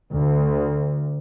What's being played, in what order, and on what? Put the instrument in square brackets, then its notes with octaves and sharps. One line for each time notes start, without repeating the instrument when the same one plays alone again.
[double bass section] D2